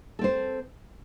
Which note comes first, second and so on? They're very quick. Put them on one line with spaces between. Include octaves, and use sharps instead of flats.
A4 C4 C5